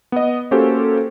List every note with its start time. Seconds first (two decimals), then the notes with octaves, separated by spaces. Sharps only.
0.12 B3 D#5
0.51 A#3 C#4 F#4 G4 A4 C5